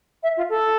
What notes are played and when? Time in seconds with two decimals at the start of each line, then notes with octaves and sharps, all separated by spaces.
0.23 E5
0.37 F4
0.49 A4